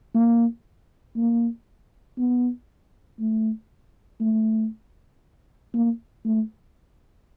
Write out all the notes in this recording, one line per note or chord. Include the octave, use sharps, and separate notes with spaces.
A#3
A#3
B3
A3
A3
A#3
A3